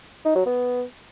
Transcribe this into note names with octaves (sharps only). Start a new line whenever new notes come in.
D#4
F#3
B3